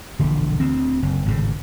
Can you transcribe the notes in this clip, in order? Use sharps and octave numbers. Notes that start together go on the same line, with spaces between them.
E1 A#1 D3
D2 C4
F#1
G#1 A2 C#3